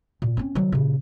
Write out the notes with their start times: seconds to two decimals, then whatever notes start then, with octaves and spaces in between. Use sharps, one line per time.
0.22 A#2
0.37 C4 C#4
0.55 D#3 F#3
0.72 A#2 C#3